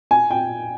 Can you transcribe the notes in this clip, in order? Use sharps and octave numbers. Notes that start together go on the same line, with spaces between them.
G#5
G5